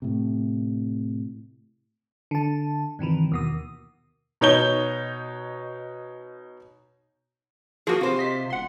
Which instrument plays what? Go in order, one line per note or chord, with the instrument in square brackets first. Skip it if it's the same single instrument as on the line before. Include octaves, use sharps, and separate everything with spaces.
[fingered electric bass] A2 C3
[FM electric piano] D3 A5
G2 C3 D#3 E3
D#2 B2 D#6
[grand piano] B2 D#4 C#5 G6 G7
[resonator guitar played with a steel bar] F3 A#3 [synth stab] F#4 G#4
[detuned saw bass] C3 [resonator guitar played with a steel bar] F4 C5
[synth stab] D#5 B6
[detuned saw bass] E1 [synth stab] F#5 C6